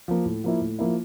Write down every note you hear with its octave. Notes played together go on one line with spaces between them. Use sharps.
F3 A#3
A2
F3 A#3 E4
A2
F3 A#3 E4